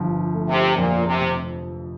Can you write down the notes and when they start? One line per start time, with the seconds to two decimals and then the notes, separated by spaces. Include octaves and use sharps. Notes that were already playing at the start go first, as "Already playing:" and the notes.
Already playing: G1 G2 F3
0.34 A3
0.49 C3
0.77 F2 A#2
1.06 C3
1.20 F1